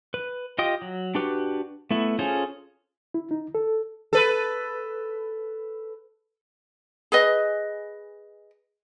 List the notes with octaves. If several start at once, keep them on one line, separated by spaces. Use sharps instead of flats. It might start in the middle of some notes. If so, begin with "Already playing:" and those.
B4
F4 G4 D#5 G5 D#6
F#3
D4 F#4 G4 B4
A3 B3 E4
C#4 F4 G#4 A4 C5
E4
D#4
A4
A4 B4
G#4 B4 D#5